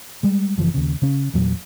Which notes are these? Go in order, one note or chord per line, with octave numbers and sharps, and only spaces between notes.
G3 G#3
F#1 E3 F3
D#2 C#3
C#3 C#4
E2 A#2 F#3